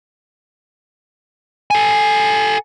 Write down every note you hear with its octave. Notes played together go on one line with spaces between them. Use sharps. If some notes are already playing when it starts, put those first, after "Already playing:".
A4 G#5